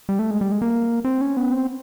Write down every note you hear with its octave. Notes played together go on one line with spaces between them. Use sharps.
G3
A3
G#3
G3
G#3
A#3
C4
C#4
B3
C4